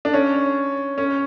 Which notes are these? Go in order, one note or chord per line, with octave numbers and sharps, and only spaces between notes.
D4
C#4
C#4